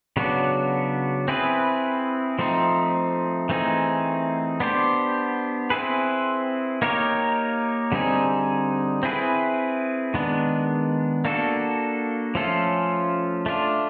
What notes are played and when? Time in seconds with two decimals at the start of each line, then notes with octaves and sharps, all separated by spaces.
0.17 C#3 F#3 B3 D4 F#4
1.28 C4 E4 G#4 B4
2.39 F3 A3 C4 D#4
3.49 E3 A3 C4 D#4 G#4
4.60 B3 D4 G4 C5
5.70 C4 E4 G#4 B4
6.82 A#3 D#4 G4 A#4 C#5
7.92 D3 G3 C4 D#4 G#4
9.03 C4 E4 G#4 B4
10.14 D#3 G#3 B3 D4
11.25 A#3 D4 F#4 A4
12.35 F3 A3 C#4 F4 A4
13.46 A3 D4 F4